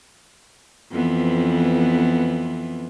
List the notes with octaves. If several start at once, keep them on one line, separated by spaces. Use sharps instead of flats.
F2 E3 B3